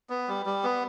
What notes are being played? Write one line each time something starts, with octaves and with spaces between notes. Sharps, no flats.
B3
G3
G3
B3